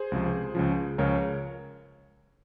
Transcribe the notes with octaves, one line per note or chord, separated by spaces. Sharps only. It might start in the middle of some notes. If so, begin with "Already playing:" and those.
Already playing: G#4 C5
C#2 C3 F3
C#2 C#3 F3
C#2 C#3 F3 A#4 C#5